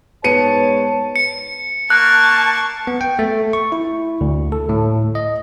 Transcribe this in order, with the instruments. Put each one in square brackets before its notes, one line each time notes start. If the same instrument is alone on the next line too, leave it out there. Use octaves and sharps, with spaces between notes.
[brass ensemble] G#2 C#5 A5 [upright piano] B3 C#7 D#7
[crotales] C#7
[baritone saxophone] A#3 [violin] A5 C#6 [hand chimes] F#6
[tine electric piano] B3
G5
A3
C#6
E4
D2
A4
A2
D#5